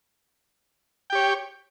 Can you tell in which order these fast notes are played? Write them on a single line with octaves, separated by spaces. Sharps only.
G5 G4 C#5